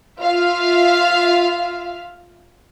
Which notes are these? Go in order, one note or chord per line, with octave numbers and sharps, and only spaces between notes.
F4 E5 F5